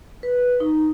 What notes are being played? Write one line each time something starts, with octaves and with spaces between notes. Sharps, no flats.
B4
D#4